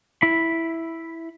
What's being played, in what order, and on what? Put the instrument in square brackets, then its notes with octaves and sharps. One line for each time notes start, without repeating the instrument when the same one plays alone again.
[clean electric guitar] E4 B5